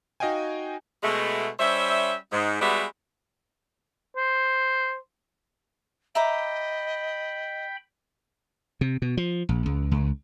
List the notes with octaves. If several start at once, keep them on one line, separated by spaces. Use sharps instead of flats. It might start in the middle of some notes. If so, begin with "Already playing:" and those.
D#4 F#4 D#5 F5 G5 G#5
B2 G#3 A3
G3 C#4 C5 E5
G#2
G3 G#3 B3 F#4 G4 E5
C5
D#5 E5 G5 A#5 B5 D6
C3
B2
F3
A#1
C#2
C#2